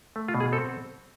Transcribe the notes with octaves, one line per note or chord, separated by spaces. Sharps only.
A3
F4
B2
G#4
C4 A4